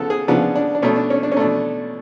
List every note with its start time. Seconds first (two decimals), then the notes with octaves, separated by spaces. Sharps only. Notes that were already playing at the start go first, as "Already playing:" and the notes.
Already playing: C#3 F3 B3 A4
0.10 G#4
0.28 C#3 F3 B3 D4
0.55 D4
0.75 D4
0.82 B2 A3 C#4
0.96 D4
1.10 C#4
1.23 D4
1.32 C#4
1.37 B2 A3 D4